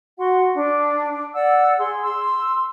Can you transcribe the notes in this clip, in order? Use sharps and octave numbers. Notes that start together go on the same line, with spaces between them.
F#4 F#5 C6
D4
D5 F#5 E6
G#4 C6
C6 E6